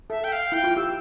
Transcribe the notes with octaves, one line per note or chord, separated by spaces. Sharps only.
A4 E5
G5
F5
E4 G5
F4
G4 E6